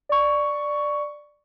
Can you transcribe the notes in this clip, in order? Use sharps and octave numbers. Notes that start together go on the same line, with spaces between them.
D5 C#6